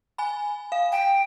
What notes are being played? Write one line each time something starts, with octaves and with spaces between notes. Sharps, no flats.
G#5 B5
F5
G5